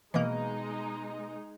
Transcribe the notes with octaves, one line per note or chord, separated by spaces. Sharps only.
B2 E3 G#3 A#3 D#4 D#5